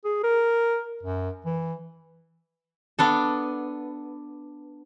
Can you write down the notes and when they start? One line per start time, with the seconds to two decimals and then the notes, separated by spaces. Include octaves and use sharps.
0.05 G#4
0.24 A#4
1.03 F#2
1.46 E3
2.99 B3 D4 A4